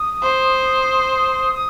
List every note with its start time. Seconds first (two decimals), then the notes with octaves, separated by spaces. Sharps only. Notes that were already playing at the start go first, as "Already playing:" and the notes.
Already playing: D#6
0.22 C5
1.55 D#6